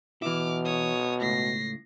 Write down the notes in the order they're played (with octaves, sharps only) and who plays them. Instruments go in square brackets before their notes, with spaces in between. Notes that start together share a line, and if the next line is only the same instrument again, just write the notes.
[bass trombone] B2 [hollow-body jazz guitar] E3 E4 [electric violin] D6 F6
[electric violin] C#5 D#6
[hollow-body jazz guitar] C#2 A2 [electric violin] A#6 C7